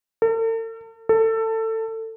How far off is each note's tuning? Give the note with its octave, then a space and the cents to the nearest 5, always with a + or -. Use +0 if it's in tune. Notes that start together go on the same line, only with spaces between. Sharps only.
A4 +45
A4 +20